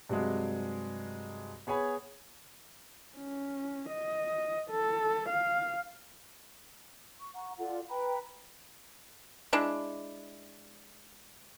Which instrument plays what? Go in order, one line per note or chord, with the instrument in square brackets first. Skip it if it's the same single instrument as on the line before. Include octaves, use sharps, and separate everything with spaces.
[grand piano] G2 C3 F#3 G#3
B3 G#4 C#5 G#5 B5
[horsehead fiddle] C#4
D#5
A4
F5
[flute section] C#6
F#5 A#5 C#6
F4 A4 D5 F#5
B4 G5 A#5 B5
[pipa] G#3 D4 E4